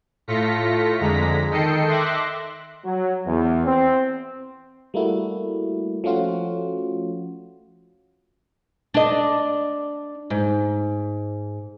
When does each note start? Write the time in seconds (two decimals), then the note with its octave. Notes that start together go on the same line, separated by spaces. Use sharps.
0.27 A2 A3 F4 A#6 B6 C#7
1.00 F2 D3 G#3 A#5 A#6 B6
1.51 D#3 A4 D#5 G5 C7 C#7
1.89 E5 C6 D6 F#6 A#6
2.85 F#3
3.27 E2
3.66 C4
4.94 G3 A3 A#3 E4 F#4
6.04 F3 A3 C#4 F4 F#4
8.94 D4 D#5
10.30 G#2